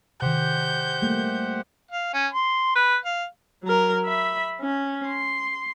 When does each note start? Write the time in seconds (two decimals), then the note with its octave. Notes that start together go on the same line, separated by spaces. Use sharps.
0.22 C3 D#3 G4 C5 F#5 G6
1.02 G3 A3 A#3
1.91 F5
2.13 C#4
2.33 C6
2.75 B4
3.05 F5
3.63 F#3 A#4
4.04 E5 B5
4.61 C#4
5.08 C6